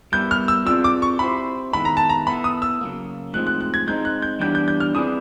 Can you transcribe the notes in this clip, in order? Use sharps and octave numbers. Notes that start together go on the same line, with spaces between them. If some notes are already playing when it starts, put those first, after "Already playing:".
G3 B3 E4 G4 A#4 G6
F6
E6
C4 F4 G#4 B4 D5 E6
D6
C#6
C4 E4 G4 C5 B5
D#3 G#3 B3 E4 B5
A#5
A5
A#5
B3 E4 A4 B5
D#6
E6
C#3 F#3 A#3
A2 F3 G#3 C4 D#4 F#6
F#6
F#6
G#6
G#3 C4 D#4 G6
F#6
G6
E3 G3 B3 D4 G4 G6
G6
G6
F6
C4 E4 G#4 B4 D5 D#6